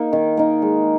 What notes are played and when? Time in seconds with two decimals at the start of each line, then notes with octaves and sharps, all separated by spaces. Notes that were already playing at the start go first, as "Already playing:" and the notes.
Already playing: A#3 D#4
0.13 D#3
0.37 A#3 D#4
0.62 G#3